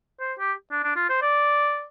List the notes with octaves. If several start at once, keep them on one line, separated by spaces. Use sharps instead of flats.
C5
G4
D4
D4
F4
C5
D5